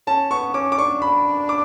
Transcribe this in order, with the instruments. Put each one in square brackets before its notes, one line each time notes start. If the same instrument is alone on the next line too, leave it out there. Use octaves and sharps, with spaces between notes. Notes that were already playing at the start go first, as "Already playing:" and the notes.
[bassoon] C#4 [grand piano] A5
[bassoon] B3 [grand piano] C#6
[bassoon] C#4 [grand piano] D6
[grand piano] D6
[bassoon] D4 [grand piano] C#6
[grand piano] B5
D6